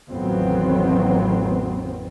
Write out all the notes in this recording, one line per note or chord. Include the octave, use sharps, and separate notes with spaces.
A1 F2 D#3 F#3 B3 C4